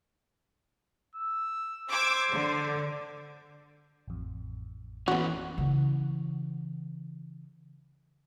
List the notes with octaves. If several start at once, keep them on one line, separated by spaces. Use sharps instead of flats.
E6
C5 D6 E6 G#6
D3
A1 F2
E3 B3 C#4 F#4
C#3 E3